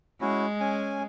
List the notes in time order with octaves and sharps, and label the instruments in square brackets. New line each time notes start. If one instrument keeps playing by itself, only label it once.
[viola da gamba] G#3 [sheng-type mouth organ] C#4 E4 F#4
[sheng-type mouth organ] C#4 G#5